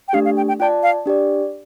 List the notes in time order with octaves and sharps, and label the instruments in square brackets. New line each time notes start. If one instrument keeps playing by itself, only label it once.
[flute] G5
[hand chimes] A3 D4 G4 [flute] F5
[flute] F5
G5
G5
[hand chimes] F4 D5 A5 [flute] G5
[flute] F5
[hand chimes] D4 G4 D5